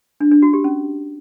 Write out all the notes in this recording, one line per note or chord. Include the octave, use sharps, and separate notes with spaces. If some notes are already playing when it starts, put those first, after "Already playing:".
D4
D4
F#4
G4
C#4